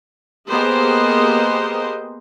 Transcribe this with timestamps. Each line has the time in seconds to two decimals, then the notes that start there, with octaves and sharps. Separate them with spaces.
0.50 A#3 B3 G4 G#4 C5 D#5